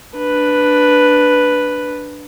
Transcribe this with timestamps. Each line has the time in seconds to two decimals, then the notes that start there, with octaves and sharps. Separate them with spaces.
0.17 D4 B4